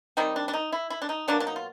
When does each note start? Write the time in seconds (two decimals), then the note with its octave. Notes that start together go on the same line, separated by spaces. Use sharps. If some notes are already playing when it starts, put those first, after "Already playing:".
0.17 D#3 G3 C4 D#4
0.36 D4
0.48 D4
0.53 D#4
0.72 E4
0.90 E4
1.02 D4
1.09 D#4
1.28 B2 F#3 A#3 D4
1.40 D4
1.47 D#4
1.56 F4